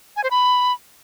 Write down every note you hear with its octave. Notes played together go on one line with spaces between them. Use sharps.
G#5
C5
B5